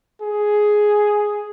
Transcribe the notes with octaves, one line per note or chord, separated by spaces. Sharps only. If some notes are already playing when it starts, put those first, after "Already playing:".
G#4